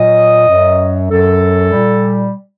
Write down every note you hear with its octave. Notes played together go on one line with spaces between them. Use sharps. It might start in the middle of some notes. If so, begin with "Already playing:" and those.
Already playing: A#2 F#3 D#5
F#2 F#3
F#2 F#3 A4
A#2 G3